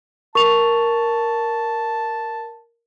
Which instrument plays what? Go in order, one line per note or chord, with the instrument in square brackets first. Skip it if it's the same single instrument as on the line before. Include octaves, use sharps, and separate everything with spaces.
[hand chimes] A#4 [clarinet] A5 [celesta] C#6 F7